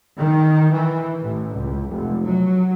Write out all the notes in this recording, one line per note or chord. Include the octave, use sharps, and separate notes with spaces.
D#3
E3
A1
C#2
F1
F#3